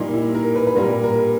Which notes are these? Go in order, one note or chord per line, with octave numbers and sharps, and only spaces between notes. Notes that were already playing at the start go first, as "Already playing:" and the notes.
Already playing: A#2 G3 A#3 D#4
E4
A#4
B4
B4
A#2 G3 A#3 A#4
A#4